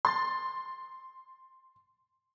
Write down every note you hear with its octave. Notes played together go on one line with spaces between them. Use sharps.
C6 A6